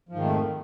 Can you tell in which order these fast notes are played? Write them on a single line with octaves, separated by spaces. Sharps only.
F3 G#2 D#3 F2 A3